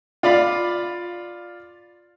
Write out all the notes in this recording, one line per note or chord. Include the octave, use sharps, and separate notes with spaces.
F4 D5 F5 B5